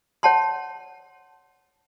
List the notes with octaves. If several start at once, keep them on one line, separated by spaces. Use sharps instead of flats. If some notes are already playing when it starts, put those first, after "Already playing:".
C#5 F#5 A5 C6